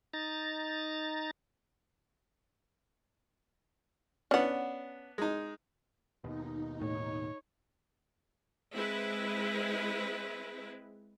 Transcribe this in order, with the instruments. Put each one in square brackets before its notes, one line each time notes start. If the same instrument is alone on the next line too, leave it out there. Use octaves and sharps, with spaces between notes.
[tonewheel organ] D#4 A#5 A6
[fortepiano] B3 D4 [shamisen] C#4 F#5
[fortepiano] G#3 D#4
[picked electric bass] D#2 B2 [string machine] D#4
[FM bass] A2 [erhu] C#5
[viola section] G#3 C4 E4 B4